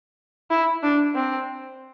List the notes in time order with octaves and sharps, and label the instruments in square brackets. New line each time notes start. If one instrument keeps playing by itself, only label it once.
[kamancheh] E4
D4
C4